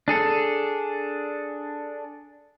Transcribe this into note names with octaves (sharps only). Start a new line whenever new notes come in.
D4 G#4 A4